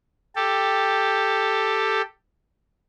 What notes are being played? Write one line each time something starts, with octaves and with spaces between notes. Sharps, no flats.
G4 A4